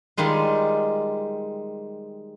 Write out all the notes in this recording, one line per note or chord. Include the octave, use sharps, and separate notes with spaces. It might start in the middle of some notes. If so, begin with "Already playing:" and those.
D#3 G3 G#3 F4